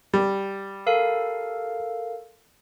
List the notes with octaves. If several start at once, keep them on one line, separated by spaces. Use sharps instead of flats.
G3
A4 A#4 F5